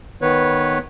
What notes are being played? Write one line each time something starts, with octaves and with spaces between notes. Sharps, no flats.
D#3 B3 B4 C#5